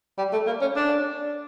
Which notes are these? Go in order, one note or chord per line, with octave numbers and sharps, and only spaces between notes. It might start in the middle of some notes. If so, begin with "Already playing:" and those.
G3
A3
A#3
C#4
D4